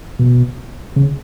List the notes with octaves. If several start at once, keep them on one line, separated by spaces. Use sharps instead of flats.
B2
C#3